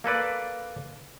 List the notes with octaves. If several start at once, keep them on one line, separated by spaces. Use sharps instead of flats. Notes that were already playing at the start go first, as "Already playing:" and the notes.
A#3 A4 B4 D5